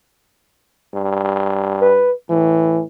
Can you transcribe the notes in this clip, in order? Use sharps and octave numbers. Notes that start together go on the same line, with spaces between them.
G2
B4
A2 E3